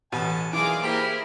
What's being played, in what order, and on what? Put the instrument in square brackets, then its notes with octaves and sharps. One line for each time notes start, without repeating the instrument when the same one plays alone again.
[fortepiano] A1 B2 [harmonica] G#5 A5
[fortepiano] E3 [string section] F#3 G#4 D5 [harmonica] A#3 D#4 F4 [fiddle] D6
[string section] A#3 E4 C5 [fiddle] G4 [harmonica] G#4 A#4